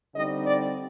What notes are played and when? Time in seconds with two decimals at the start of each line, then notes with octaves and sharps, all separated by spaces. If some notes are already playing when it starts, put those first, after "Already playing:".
0.15 D3 G3 C4 D#4 D#5
0.46 D5